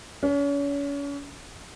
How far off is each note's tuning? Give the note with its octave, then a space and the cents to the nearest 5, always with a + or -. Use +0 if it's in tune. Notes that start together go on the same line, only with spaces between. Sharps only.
C#4 +35